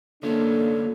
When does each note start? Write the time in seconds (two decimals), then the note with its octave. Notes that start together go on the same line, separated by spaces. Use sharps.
0.23 D3 A#3 C#4 D4 F4 A4